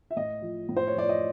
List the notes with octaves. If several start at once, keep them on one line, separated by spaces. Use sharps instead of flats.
E5
A2 D#5
F3
A2
C5
C#5
F3 D5
D#5